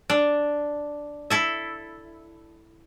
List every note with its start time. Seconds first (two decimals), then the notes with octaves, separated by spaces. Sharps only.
0.10 D4
1.30 E4 A4 E5